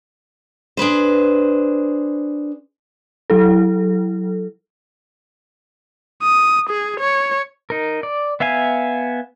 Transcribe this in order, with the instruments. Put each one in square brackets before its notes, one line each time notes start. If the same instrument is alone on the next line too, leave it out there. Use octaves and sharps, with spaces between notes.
[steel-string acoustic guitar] D4 G#4 B4 C5
[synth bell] F#3 E4 A4
[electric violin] D#6
G#4
C#5
[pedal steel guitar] D#4 A#4
D5
B3 E5 F5 G#5